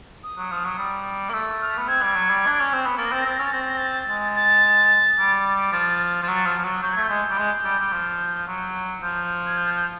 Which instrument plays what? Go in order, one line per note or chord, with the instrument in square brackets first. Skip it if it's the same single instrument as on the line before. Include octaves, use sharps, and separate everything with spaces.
[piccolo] D#6
[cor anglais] F#3
F3
F#3
G3
A#3
[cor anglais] A3 [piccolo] E6
[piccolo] F6
[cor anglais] B3
[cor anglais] C4 [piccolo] G#6
[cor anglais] G3
F#3
G3
D4
C#4
C4
B3
[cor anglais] A#3 [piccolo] A6
[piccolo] A#6
[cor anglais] C4 [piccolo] A6
[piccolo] A#6
[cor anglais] C4 [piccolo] A6
[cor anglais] C#4 [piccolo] A#6
[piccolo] A6
[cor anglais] C4 [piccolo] A#6
[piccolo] A6
A#6
A6
[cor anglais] G#3 [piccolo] A6
[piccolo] A6
[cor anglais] G3
[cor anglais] F3 [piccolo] A6
[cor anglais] F3
F#3
F3
F3
F#3
[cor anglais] F#3 [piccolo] G6
[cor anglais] A3 [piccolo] G#6
[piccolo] G6
[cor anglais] G#3
G3
G#3
G3
G3
F3
F#3
[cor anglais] F3 [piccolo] G6
[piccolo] G#6
G6
G6